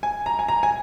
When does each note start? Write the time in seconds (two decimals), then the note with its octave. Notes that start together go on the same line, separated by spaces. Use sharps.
0.03 G#5
0.26 A#5
0.39 G#5
0.48 A#5
0.63 G#5